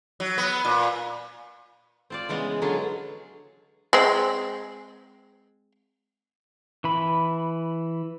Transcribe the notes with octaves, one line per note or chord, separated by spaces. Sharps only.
F#3
B3
A#2
C4 F4 D5
C#3 E3 G#3 B3
D3 F#3 G#3 F4 G#4 B4
G#3 C4
E3 B5